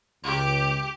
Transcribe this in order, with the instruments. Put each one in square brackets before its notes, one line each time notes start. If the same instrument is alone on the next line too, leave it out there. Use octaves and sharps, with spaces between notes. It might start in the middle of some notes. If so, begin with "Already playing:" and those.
[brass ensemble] C#2 [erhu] G4